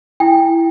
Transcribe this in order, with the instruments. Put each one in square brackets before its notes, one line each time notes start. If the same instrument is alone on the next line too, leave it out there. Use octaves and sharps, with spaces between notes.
[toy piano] E4 G5